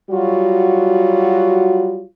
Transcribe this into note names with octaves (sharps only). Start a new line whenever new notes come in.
F#3 G3 F4 F#4